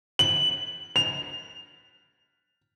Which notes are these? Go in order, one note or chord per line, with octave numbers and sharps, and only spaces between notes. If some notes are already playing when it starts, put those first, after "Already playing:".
F#7
F7